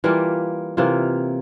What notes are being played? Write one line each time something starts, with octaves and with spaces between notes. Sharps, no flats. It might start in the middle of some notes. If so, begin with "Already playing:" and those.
E3 G3 A#3 F4
C3 E3 A#3 F4